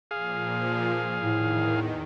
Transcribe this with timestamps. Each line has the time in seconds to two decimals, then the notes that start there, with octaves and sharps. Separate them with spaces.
0.11 A#2 F3 G#4 F5
1.19 E2 A2 D#3